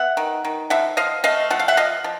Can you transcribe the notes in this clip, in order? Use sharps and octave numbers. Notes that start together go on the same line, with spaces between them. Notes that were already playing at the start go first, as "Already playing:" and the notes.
Already playing: B3 E5 F#5
D#3
D#3
F3 E5 F#5
F3 D#5 F5
A3 D#5 F5
F3 F#5
F5
E5 F#5
F3 D#5 F5
F3